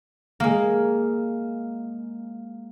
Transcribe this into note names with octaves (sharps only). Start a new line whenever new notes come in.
G#3 A#3